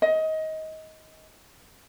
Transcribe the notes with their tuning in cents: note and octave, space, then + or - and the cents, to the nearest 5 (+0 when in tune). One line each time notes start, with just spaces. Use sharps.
D#5 +20